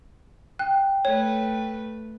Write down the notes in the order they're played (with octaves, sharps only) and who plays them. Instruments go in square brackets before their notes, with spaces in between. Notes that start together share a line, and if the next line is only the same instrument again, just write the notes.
[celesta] G5 [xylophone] F#6
[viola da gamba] A3 B4 [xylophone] C#5